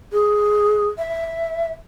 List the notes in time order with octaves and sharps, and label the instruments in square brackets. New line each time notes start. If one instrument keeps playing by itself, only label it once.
[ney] G#4
E5